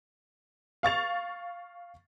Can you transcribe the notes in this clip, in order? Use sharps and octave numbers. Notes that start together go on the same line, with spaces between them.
F5 C#6 A6 F7